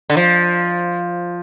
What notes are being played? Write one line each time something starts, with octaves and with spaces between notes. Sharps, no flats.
D3
F3